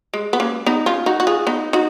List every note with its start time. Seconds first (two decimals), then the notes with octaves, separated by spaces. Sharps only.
0.14 G#3
0.33 B3
0.40 A#3 C#4
0.66 B3 D#4
0.86 C#4 F4
1.06 D#4 F#4
1.20 F#4
1.27 F4 G#4
1.47 B3 D#4
1.73 D#4 F#4